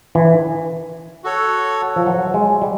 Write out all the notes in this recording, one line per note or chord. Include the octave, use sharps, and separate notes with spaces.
E3
F#4 A4 C#5
F3
F#3
G#3
G3